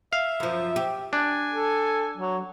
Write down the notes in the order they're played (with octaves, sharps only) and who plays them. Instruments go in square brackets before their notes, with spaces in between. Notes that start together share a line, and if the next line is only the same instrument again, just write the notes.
[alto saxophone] E5 [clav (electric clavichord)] F5
[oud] F#2 F3
G4
[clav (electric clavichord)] D4 [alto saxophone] G#5
[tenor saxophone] A4
F#3